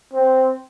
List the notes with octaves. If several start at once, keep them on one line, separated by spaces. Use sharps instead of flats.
C4